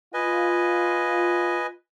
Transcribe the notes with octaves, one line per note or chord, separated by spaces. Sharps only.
F4 B4 D#5 G#5